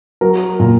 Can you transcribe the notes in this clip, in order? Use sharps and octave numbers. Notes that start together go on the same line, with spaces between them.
F#3 A#4
A#2